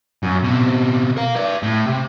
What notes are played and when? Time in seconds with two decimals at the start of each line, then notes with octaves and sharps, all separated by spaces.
0.23 F#2
0.43 B2 C4
1.17 A#4 F5
1.36 B4 D5
1.63 A2
1.86 C3